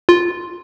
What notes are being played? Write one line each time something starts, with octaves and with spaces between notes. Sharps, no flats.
F4